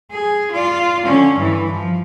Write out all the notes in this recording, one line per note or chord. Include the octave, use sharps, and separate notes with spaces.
G#4
F4 D5
D3 C#4
G2 E3
F3